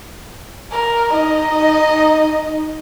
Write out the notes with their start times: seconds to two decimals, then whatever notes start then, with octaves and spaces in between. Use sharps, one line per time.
0.72 A#4
1.13 D#4 D#5